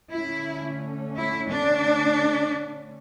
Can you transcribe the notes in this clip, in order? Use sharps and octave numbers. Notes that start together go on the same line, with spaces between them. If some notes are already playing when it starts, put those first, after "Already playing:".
D3 A3 C#4 E4
E4
D4